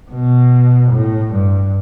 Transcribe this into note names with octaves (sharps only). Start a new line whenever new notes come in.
B2
A2
G2